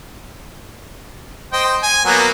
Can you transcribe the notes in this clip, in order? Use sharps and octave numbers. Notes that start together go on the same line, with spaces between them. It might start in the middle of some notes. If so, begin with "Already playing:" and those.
C5 D#5 G5
G#5
F#3 A#3 B3